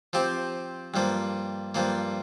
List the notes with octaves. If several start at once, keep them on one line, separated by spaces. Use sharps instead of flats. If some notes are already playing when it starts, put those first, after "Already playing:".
F3 C4 G4
G2 F3 A#3
G2 F3 A#3